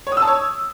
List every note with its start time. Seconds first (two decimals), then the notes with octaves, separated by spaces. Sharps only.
0.07 C#5
0.12 D#6
0.17 E6
0.22 A5
0.27 C#5